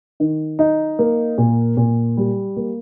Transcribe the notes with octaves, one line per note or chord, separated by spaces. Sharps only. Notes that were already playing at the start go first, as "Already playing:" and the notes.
D#3
D#4
A#3
A#2
A#2
G3
A#3